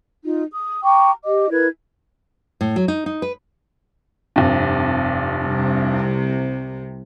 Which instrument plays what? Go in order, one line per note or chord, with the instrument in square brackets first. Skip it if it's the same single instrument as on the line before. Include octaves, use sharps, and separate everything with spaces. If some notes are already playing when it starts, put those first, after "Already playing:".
[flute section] D#4 F4
D#6
G5 A#5 C#6 D6
G4 D#5 D6
E4 A#4 B4 G#6
[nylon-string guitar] A2
F#3
D#4
D#4
B4
[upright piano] F1 G2
[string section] C2 C3